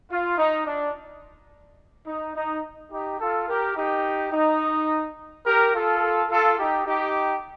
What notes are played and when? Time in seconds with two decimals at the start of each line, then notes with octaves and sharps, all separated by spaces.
0.10 F4
0.38 D#4
0.66 D4
2.07 D#4
2.35 D#4
2.92 D#4 G4
3.20 F4 A4
3.48 G4 A#4
3.76 D#4 G4
4.33 D#4
5.46 G4 A#4
5.73 F4 A4
6.30 F4 A4
6.58 D#4 G4
6.86 D#4 G4